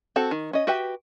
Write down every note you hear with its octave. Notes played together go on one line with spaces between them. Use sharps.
C4 F#4 A4
D#3
C#4 D#5
F#4 G4 B4 E5 G5